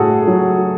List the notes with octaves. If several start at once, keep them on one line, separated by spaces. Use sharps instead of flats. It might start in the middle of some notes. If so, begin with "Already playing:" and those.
Already playing: A2 F#4 G#4 A4
F#3